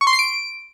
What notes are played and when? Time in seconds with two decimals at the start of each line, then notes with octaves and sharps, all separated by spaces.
0.01 C#6
0.07 C6
0.13 C7
0.19 D7